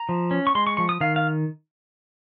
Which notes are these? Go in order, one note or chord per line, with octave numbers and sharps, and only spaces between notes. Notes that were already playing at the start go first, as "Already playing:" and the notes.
Already playing: A#5
F3
C#4
C#6
G#3 C6
C#6
F3 C#6
D#6
D#3 F5
F5